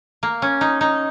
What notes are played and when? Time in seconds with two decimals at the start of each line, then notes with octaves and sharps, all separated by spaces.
0.23 A#3
0.42 C#4
0.61 D#4
0.81 D#4